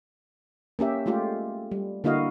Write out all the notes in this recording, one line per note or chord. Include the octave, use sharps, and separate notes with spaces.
A#3 C#4 G4 E5
G#3 A3 F4 G4
G3
D3 A#3 E4 F#4 D#5 F5